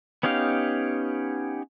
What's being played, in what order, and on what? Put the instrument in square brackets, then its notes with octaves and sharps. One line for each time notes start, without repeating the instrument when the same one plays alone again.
[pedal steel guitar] B3 C#4 D#4 G4 F5